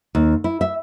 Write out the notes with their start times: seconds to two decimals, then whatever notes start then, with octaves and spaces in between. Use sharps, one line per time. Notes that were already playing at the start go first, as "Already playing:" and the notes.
0.15 D#2
0.44 E4
0.61 E5